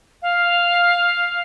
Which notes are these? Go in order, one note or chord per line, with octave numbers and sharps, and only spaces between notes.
F5